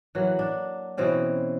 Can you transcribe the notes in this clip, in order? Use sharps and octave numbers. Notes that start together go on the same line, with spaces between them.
E3 F#3 A#3 F#4
D4
B2 E3 C4 C#4